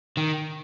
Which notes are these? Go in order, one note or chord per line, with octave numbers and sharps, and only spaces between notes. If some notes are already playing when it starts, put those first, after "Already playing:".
D#3